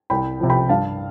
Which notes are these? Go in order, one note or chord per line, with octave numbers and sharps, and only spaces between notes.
C2 G5 B5
C3 F3
G5 B5
G2 F5 A5